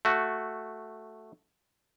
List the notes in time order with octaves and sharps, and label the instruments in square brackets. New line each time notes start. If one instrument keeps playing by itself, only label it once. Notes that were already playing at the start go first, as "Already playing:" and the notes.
[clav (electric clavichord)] A3 F#4